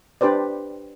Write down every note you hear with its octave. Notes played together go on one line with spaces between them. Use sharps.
D4 G4 B4 C5 D5